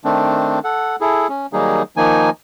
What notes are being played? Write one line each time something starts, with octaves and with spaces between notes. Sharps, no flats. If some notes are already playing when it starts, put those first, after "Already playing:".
D#3 A3 C4 D4
A4 F#5
E4 G#4 A4
C#4
D#3 F#3 G3 A#3 D#4 G#4
D#3 F3 A#3 D#4 G#5